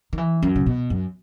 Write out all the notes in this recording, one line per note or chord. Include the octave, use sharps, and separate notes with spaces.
D#3
E3
F#2
C#3
B2
F#2